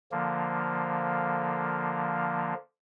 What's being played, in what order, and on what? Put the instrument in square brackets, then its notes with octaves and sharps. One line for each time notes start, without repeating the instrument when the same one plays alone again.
[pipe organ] D3 F3 A#3